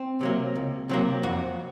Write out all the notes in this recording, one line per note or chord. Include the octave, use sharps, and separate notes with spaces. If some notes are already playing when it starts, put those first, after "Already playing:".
Already playing: C4
C3 F#3 A#3
C#2
C3 F#3 A#3
F2 F#4